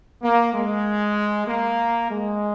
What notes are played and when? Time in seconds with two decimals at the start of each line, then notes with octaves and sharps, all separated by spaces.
0.22 A#3
0.54 G#3
1.47 A#3
2.09 G#3